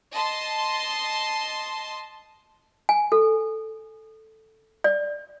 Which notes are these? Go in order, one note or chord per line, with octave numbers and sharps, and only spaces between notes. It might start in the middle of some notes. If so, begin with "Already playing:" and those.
D#5 A5 C6
G#5
A4
D5